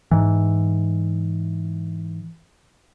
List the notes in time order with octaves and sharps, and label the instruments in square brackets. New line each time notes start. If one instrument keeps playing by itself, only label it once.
[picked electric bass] G#2 E3